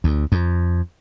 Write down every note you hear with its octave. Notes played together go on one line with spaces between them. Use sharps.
D2
F2